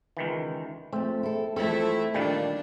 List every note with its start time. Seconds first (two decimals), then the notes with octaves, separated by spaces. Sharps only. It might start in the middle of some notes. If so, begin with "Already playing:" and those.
0.17 C#2 D#3 E3
0.93 F2 A3 C4
1.23 E4 A4
1.56 E3 F3 A3 C4 E4 A4
2.14 A#2 D#3 G3 D4 F5